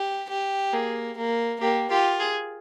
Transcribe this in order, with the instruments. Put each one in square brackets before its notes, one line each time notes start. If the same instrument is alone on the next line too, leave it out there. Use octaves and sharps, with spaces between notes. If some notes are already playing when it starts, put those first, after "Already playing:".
Already playing: [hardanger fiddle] G4
G4
[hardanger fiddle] A#3 [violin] G#4
[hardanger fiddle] A#3
[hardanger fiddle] A#3 [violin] G4
[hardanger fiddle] F4 [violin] G4
[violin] G#4